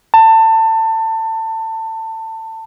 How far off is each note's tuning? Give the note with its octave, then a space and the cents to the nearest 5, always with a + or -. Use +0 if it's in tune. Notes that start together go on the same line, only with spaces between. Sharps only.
A5 +25